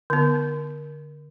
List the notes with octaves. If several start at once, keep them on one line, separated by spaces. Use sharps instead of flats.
D3 B3